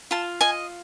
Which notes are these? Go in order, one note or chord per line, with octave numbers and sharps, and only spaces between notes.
F4 A5
D#5 G#5